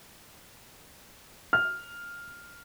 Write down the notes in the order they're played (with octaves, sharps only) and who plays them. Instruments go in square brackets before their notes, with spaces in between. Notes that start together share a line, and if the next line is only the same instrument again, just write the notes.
[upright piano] F6